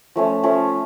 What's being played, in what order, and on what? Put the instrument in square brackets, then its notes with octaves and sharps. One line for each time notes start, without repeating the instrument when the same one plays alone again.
[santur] F3 A3 C#4
F3 A3 C#4